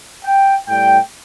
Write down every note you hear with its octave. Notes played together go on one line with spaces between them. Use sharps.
G5
A2 G3 G5